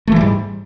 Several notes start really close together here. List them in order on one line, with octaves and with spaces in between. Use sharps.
A3 E3 G3 G#2